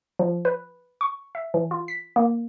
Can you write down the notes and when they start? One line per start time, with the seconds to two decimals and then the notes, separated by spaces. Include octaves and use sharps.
0.19 F3
0.45 B4
1.01 C#6
1.35 E5
1.54 E3
1.71 F4
1.88 B6
2.16 A#3